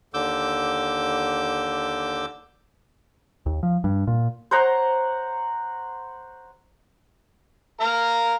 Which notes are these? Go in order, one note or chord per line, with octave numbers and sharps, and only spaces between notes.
D#2 D3 D6 E6 G6
D#2
F3
G2
A#2
C5 C#5 F#5 A#5
A#4 F5 A#5